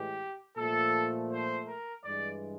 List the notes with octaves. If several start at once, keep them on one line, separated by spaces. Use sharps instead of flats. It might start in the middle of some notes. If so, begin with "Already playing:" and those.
Already playing: A2 E3 G#3 G4
A#2 F3 A3 A4
C5
A#4
G2 E3 G#3 D5